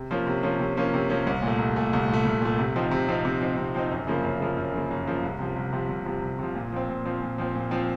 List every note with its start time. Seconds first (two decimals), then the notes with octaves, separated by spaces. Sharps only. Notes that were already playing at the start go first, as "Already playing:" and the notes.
Already playing: C3
0.11 F3 A#3 C#4
0.27 C3
0.43 F3 A#3 C#4
0.59 C3
0.77 F3 A#3 C#4
0.94 C3
1.09 F3 A#3 C#4
1.27 C2
1.42 A#2
1.47 A3
1.59 C2
1.76 A#2 A3
1.93 C2
2.08 A#2
2.13 A3
2.25 C2
2.42 A#2 A3
2.59 C3
2.76 F3 C4 D#4
2.91 C3
3.08 F3 C4 D#4
3.25 C3
3.41 F3 C4 D#4
3.57 C3
3.75 F3 C4 D#4
3.91 F#2
4.07 C#3 F3 A#3
4.24 F#2
4.40 C#3 F3 A#3
4.57 F#2
4.73 C#3 F3 A#3
4.91 F#2
5.06 C#3 F3 A#3
5.23 C2
5.39 C3 F3
5.56 C2
5.73 C3 F3
5.89 C2
6.06 C3 F3
6.22 C2
6.39 C3 F3
6.55 A#2
6.72 F3 C4
6.89 A#2
7.05 F3 C4
7.22 A#2
7.38 F3 C4
7.55 A#2
7.71 F3 C4